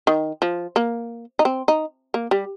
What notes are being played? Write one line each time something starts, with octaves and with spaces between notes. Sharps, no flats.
D#3
F3
A#3
D#4
C4
D#4
A#3
G3